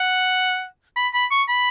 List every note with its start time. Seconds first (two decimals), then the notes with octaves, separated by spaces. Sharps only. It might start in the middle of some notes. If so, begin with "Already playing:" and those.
Already playing: F#5
0.96 B5
1.14 B5
1.31 C#6
1.49 B5